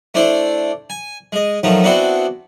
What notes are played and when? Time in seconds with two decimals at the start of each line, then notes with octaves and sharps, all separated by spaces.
0.14 A3 D4 E4 C5 D5
0.90 G#5
1.32 G#3 D#5
1.63 D#3 F3 F#3 A3 D#4
1.84 B3 C4 D4 E4 F#4 C5